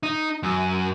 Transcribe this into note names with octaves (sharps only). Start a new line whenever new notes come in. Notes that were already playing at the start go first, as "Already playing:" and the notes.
D#4
F#2